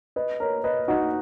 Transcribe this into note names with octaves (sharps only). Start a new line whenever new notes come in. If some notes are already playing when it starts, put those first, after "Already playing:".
B4 D#5
A#4 C#5
B4 D#5
D#4 F#4